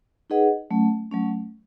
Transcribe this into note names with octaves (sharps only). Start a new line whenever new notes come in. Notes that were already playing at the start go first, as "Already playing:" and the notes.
D#4 G#4 B4 D#5 F#5
F#3 A3 C#4
F#3 A3 C#4